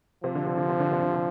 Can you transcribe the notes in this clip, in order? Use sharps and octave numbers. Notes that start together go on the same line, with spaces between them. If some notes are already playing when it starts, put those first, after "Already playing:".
C3 F3
D3
C3
D3
C3
D3
C3
D3
C3